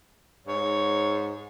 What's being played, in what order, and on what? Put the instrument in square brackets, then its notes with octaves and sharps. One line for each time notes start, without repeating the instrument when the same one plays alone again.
[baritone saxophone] G#2 [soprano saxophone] C#5